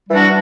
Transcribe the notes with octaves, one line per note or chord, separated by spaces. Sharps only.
E3 G3 D4 F#4